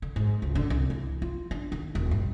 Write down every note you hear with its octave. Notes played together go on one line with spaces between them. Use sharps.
D3
G#2
C#2
D3
C2
E3
F4
D4
D#3
D#1
G2